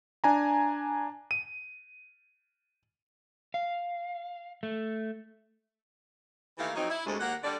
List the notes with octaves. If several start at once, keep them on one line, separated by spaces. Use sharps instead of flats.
D4 G#5 A#5
D#7
F5
A3
D#3 E3 A3 A#3 G4 F5
F2 F#3 C4 D#4
E4
D2 C3 G#3
D#2 A#3 A#4 F#5
D3 G3 D5